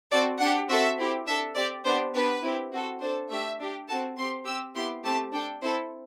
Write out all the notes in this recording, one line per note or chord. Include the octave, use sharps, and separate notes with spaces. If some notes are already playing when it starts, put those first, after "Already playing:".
C4 F#4 A4 D5
D4 G4 F#5
C4 F#4 A4 E5
C4 E4 G4
D4 A4 E5
C4 G4 D5
B3 D4 G4 C5
B3 D4 G4 B4
C4 E4 G4
C4 F#4 A4
D4 A4 C5
A3 D4 G4 E5
D4 G4
C4 F#4 A4 A5
C4 G4 C6
C4 G4 E6
B3 E4 G4 C6
A3 C4 G4 A5
D4 A4 G5
C4 E4 A4 C5